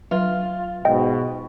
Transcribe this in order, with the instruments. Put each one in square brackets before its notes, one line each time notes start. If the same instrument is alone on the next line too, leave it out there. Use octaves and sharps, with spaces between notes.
[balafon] F#3 B4 [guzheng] F4
[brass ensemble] G#2 B2 [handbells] D#5 G5